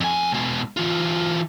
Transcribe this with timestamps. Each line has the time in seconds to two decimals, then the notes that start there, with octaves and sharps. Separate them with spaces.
0.01 F2 G#5
0.34 B2 G#3
0.77 E3 F4